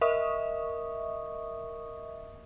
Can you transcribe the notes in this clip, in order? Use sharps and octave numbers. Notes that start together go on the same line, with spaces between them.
A#4 D#5 E5 C#6 D#6